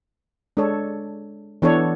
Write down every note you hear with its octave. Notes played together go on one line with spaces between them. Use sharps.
G#3 D4 A4 C#5
E3 B3 D4 A4 C#5